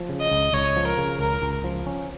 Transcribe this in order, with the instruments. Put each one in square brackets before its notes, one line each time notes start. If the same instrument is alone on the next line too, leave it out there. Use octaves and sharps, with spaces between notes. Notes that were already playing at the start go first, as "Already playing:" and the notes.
Already playing: [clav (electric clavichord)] F3
C#3
[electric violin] D#5
[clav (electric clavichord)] C#2
[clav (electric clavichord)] C#2 [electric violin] C#5
[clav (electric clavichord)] F3
[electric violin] A#4
[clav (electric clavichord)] C#3
[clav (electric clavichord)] C#2 [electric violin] A#4
[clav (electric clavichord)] C#2
F3
C#4